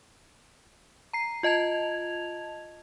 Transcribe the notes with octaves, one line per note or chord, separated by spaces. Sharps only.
A#5 C7
F4 D#5 A5 G#6 F7